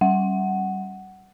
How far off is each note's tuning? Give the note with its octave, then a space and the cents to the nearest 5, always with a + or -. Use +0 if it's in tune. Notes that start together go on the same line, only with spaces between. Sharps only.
G3 -20 F#5 +10